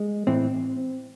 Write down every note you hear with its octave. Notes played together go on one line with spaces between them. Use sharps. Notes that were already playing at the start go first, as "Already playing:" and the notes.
Already playing: G#3
A2 E3 C4